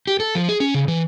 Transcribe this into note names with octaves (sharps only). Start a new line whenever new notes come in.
G4
A4
F3
G#4
C#4
C#3
E3